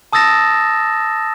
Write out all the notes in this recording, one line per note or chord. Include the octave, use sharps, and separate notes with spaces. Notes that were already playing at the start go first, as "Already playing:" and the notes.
A5 D#6 E6 A6 A#6 E7